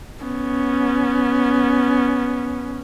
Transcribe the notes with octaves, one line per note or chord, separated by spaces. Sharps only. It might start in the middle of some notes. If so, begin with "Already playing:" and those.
B3 C#4